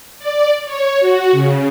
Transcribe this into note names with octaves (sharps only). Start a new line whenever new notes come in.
D5
C#5
F#4
C#3